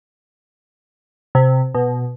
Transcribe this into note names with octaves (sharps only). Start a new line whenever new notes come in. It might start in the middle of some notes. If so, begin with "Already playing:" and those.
C3
B2